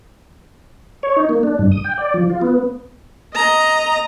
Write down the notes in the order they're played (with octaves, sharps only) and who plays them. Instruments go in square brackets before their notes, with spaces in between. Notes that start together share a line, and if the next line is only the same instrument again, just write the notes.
[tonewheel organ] C#5
D#4
A#3
D4
G2
D#6
G5
D5
F3
F4
B3
[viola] D#5 A#5